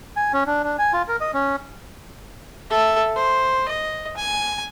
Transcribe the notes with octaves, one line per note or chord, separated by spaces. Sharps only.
G#5
C#4
D4
D4
G#5
F4
A#4
D#5
C#4
A4 E5
C5
D#5
G#5